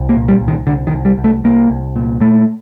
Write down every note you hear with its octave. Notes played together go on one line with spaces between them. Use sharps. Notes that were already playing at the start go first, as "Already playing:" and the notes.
Already playing: C2
A#3
A#2
G3
C2
D#3
C2 D3
D#3
C2
G3
C2
A3
C2 A#3
C2
A#2
A#2 A3